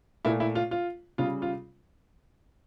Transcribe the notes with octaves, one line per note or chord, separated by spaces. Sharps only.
A#2 A3 E4
E4
F4
F4
C#3 G3 F4
F4